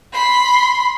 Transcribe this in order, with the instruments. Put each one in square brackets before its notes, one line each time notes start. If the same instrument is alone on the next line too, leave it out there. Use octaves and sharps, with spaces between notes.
[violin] B5 C6